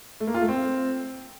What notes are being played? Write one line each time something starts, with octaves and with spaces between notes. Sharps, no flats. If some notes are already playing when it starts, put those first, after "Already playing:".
A3
A#3
F4
A3
C4